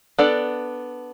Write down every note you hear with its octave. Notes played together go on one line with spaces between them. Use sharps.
B3 D4 A4 D5